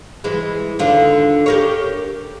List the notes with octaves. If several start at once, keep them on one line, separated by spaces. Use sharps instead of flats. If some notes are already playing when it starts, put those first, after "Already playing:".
E3 G#3
D#2 D3 F4
G4 A#4 C#5